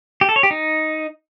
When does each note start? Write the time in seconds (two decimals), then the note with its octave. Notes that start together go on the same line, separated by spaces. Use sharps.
0.21 G4
0.29 A4
0.36 C#5
0.43 G4
0.51 D#4